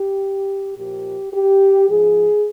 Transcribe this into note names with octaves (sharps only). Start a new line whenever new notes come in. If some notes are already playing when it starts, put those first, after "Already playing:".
Already playing: G4
A#2 F3 G4
G4
G#2 F3 G#4